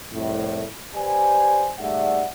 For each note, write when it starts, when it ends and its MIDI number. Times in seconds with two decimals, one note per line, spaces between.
0.13 0.63 36
0.13 0.63 41
0.13 0.63 45
0.95 1.70 67
0.95 1.70 71
0.95 1.70 72
0.95 1.70 74
0.95 1.70 80
1.79 2.25 44
1.79 2.25 55
1.79 2.25 57
1.79 2.25 74
1.79 2.25 76
1.79 2.25 78